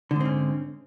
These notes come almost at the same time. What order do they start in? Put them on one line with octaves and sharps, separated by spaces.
D3 G#2 C4 C#4